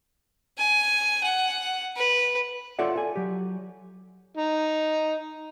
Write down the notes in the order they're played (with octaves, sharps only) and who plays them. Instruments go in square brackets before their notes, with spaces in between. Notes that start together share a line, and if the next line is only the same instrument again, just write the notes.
[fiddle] G#5
F#5
B4
[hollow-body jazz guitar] F4 A4 C#5 D5 E5 F#5
A4 G#5
F#3 G4
[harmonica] D#4